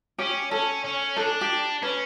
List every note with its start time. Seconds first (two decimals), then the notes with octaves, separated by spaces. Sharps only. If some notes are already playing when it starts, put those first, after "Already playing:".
0.18 C#4 G4
0.51 C#4 A4
0.84 C#4
1.16 D4 A4
1.41 G4
1.82 C#4 B4